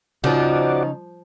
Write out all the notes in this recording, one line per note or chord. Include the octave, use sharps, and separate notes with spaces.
C#3 F3 C#4 D#4 F#4 D5